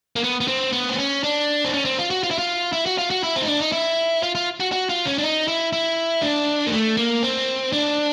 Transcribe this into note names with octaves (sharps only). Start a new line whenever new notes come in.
A#3
B3
B3
C4
B3
C4
C#4
D4
C4
C#4
C4
F4
F#4
F4
E4
F4
E4
F#4
F4
F#4
E4
C4
D#4
D4
D#4
E4
F4
F4
F#4
F#4
F4
C#4
D4
D#4
E4
E4
D4
A#3
A3
A#3
C4
D4